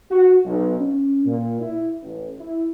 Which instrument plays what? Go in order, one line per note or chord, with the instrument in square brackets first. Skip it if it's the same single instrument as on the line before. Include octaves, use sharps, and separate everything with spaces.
[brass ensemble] F#4
B1
C#4
A#2
E4
A1
E4